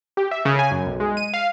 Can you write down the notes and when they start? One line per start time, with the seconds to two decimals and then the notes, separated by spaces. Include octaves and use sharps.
0.17 G4
0.31 E5
0.45 C#3
0.59 G#5
0.71 F#2
0.86 B1
1.00 G#3
1.17 D#7
1.34 F5